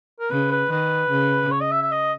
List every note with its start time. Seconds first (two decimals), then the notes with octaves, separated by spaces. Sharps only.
0.20 A#4
0.30 C#3 B4
0.51 B4
0.71 D#3 B4
1.11 C#3
1.51 C#5
1.61 D#5
1.72 E5
1.82 E5
1.92 D#5